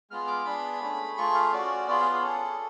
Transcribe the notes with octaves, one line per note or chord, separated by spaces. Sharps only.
G#3 B3 F4 G#4 F6
D6
B3 D4 G#4 B5
A3 C#4 G#4
A3 F4 G#4 C#6
F5
C#4 F#4 D5
B3 F4 G#4 D5
F5
G#4
C#4 G#4 A4